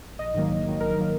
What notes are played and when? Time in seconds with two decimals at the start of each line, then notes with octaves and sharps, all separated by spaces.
0.19 A#1 D#5
0.34 G#2 D#3 F#3 A#3
0.50 A#1
0.65 G#2 D#3 F#3 A#3
0.80 A#1 A#4
0.98 D#3 F#3 A#3